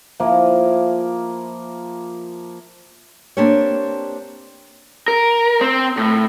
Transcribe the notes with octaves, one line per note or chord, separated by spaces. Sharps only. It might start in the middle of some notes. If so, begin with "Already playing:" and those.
F3 A#3 E4
A#3 C4 D4 G4 C#5
A#4
C4
A2